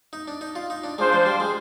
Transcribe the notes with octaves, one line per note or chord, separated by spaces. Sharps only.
D#4
D4
D#4
F4
D#4
D4
G#3 D4 F4 C5
F3
G3
G#3